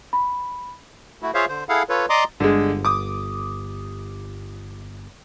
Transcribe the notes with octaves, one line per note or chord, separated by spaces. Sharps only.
B5
A3 E4 F#4
F4 G#4 C5 C#5 E5 F5
D3 C5
E4 G#4 A4 F5 F#5
F4 A4 B4 C#5
D5 D#5 A#5 C6 D6 D#6
G1 D3 G#3
D6 D#6